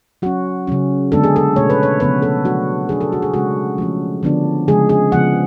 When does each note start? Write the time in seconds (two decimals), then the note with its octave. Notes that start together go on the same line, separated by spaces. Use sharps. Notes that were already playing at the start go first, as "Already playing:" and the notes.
0.22 F#3 C#4 F#4
0.67 C#3 F#3 C#4
1.12 D3 G#3 B3 D4 A4
1.24 G#4
1.36 A4
1.56 B2 A3 C#4 C#5
1.70 B4
1.83 C#5
2.00 C#3 F3 B3 B4
2.22 A4
2.45 C#3 F#3 A3 D4 F#4
2.89 F#3 B3 D4 G#4
3.01 A4
3.13 F#4
3.22 G#4
3.34 C#3 G#3 C#4 F#4
3.78 F3 A3 C#4
4.23 D3 F3 B3 D4
4.68 C#3 F3 G#3 G#4
4.89 G#4
5.12 C#3 F3 B3 F#5